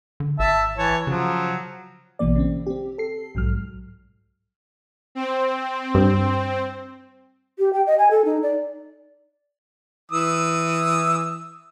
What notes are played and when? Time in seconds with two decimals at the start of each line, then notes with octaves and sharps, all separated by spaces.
0.20 D3
0.39 G#1 E5 A5
0.77 E3 C#5 A5
1.07 C#3 F3 F#3
2.19 A#1 B2 E3 A#3 D5
2.36 C#3 C4
2.66 C4 G4
2.98 A4 C7
3.35 B1 G#2 F#3 F6
5.15 C4
5.95 G2
7.59 G4
7.73 G5
7.87 D#5
7.99 G#5
8.11 A4
8.25 D#4
8.43 D5
10.12 E3 D#6 E6